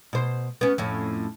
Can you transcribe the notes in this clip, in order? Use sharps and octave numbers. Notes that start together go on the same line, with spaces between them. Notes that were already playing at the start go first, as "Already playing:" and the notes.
B2 C5
B3 C#4
F2 A2 C#4